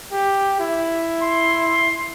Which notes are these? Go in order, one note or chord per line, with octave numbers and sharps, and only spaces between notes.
G4
E4
C6